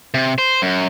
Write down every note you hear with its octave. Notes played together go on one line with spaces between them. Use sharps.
C3
C5
F#2